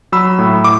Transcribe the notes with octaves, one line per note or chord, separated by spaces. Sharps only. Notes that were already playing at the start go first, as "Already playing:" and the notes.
F#3 B5 E6
A2
D6